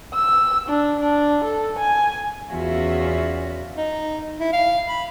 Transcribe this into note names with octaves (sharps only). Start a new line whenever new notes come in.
E6
D4
D4
A4
G#5
E2 C#4 F4 F#4 E5
D#4
E4
F5
B5